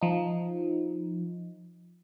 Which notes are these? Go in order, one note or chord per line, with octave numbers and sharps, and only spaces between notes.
F3 D#4